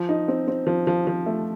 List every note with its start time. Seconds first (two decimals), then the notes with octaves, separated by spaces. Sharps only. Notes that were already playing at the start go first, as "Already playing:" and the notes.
Already playing: F3
0.09 D#4
0.28 C4
0.48 C4
0.67 F3
0.87 F3
1.07 F3
1.26 A3